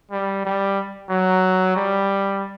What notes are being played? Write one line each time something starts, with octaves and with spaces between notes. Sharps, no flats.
G3
G3
F#3
G3